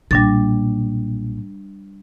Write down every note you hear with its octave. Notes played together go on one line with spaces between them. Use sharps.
B1 A#2 G3 D4 A6